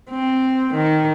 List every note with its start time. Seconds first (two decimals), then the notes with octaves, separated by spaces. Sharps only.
0.10 C4
0.74 D#3